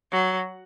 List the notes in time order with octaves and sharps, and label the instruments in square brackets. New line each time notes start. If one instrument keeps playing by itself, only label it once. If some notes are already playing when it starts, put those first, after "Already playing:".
[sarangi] F#3